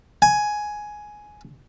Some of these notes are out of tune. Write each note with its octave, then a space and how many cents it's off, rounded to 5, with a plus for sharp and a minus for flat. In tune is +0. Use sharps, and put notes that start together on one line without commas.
G#5 +10